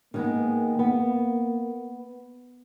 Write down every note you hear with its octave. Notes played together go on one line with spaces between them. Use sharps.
D#3 G#3 A#3 B3
B3